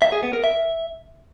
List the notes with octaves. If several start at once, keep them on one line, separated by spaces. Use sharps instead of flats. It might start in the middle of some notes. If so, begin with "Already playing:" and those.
E5
G#4
B3
A#4
E5